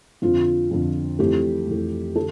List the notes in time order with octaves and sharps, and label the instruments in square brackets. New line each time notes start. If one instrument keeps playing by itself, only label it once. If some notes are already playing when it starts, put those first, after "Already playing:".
[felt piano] F2 D3 F3 F4
F2 D3 F3
F2 E3 A3 G4
F2 E3 A3
D3 A4